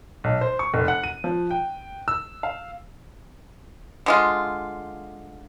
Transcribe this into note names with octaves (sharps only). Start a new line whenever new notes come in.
B1
C5
C#6
F1
F#5
D#7
F3
G5
E6
F5
D3 G#3 F4